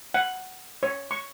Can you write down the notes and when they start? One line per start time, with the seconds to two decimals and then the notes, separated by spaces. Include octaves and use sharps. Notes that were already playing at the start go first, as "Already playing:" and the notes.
0.14 F#5
0.83 C#5
1.11 C#6